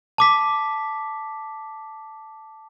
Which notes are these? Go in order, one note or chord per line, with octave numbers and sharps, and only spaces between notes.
A5 D6 B6